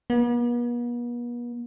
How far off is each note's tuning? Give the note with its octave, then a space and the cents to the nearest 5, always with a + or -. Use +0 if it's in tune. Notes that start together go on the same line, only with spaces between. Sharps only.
B3 -45